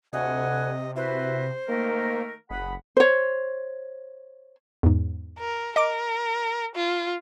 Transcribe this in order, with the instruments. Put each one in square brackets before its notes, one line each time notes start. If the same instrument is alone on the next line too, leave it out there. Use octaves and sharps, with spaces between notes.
[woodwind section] D2 F#5 G#5 [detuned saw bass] C3 [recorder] D#5
[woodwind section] E4 F#4 B4 [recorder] C5
[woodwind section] D#3 A3 A#4 [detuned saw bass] A#3
[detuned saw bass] F#1 [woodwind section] G#4 F#5 B5
[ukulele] C5 C#5
[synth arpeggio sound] E2 G#2
[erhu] A#4
[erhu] A#4 [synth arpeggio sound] D#5 D6 D7
[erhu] F4